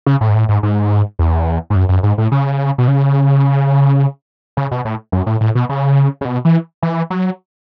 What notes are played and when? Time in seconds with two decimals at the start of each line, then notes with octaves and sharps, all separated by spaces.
0.06 C#3
0.21 A2
0.29 G#2
0.35 A2
0.49 G#2
0.63 G#2
1.19 E2
1.70 G#2
1.75 F#2
1.89 F#2
2.03 G#2
2.18 A2
2.32 C#3
2.78 B2
2.88 C#3
4.57 C#3
4.71 B2
4.85 A2
5.12 F#2
5.26 A2
5.41 A2
5.55 B2
5.69 C#3
6.21 C#3
6.25 B2
6.45 E3
6.83 E3
7.10 F#3